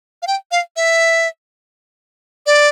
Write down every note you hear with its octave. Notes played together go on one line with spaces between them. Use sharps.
F5
G5
F5
E5
D5